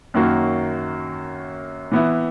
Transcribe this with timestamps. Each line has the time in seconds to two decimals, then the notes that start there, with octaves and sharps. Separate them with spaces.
0.14 F#2 D#3 A#3 C#4 F#4
1.92 E3 B3 E4